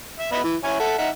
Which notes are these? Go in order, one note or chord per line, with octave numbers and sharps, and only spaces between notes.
E5
B3 D#5 E5
E3
E4 C#5 G#5
A4 E5 F#5
D#4 E5 F#5